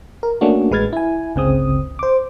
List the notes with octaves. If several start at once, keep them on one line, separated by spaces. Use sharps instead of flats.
A#4
A3 A#3 C#4 D4 F#4
A1 G#3 B4 F6 G#6 A6
E4 G#5
G1 C#2 C#3 C4 D#6
C5 D6